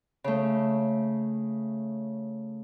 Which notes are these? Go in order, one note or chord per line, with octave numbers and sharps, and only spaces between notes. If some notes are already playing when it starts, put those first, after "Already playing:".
C#3 A3